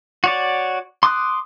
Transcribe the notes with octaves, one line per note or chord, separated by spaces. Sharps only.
F#4 C#5 D5
C6 D6 D#6 F#6